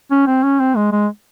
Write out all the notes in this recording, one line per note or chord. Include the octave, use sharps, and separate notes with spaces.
C#4
C4
C#4
C4
G#3
G#3